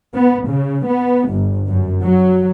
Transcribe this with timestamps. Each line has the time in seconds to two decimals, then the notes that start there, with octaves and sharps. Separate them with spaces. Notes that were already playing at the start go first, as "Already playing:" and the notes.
0.15 B3
0.49 C#3
0.87 B3
1.31 G1
1.69 F#2
2.03 F#3